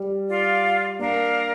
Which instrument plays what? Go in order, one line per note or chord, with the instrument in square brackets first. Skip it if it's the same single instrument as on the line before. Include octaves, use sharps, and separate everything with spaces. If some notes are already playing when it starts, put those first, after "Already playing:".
Already playing: [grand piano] G3
[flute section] F4 D5 F5
[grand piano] A#3 [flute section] D4 A#4 F5